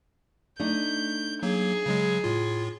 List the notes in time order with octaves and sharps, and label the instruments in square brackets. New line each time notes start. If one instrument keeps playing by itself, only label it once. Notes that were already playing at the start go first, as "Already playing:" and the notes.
[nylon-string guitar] A3 D4 D#4 [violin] G6
[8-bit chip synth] F#3 A#3 [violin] G#4
[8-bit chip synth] C#3 F#3 G#3
A2 F4